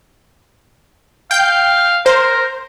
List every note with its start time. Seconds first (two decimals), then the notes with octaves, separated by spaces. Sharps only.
1.31 F5 G5 G6
2.06 A#4 C5